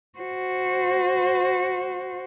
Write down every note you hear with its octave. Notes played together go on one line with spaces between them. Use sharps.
F#4 C5